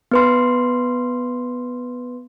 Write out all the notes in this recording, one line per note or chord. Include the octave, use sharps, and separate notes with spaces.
B3 B4 C6